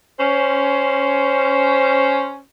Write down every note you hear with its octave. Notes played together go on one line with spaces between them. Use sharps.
C#4 C5